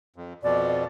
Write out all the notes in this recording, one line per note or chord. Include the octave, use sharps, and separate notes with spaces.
F2
F2 B2 D5